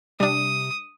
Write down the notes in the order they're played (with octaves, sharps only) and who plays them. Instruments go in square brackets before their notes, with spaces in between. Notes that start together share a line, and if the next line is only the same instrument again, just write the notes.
[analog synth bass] C3 [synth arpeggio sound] G3 D4 [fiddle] D#6